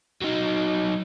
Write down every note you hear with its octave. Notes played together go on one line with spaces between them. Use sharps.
F#3 D#4